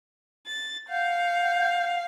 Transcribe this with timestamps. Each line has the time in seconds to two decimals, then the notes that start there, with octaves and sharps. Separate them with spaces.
0.47 A6
0.89 F5 F#5 G6